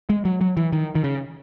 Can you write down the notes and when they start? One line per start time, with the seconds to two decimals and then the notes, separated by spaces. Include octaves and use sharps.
0.10 G#3
0.25 F#3
0.41 F#3
0.57 E3
0.73 D#3
0.95 D#3
1.04 C#3